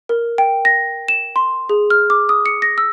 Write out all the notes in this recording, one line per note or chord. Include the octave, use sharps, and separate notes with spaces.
A#4
G5
A#6
E7
C6
G#4
F6
D6
D#6
C#7
A#6
E6